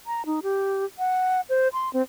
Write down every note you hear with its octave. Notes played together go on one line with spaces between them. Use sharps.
A#5
D#4
G4
F#5
C5
C6
C4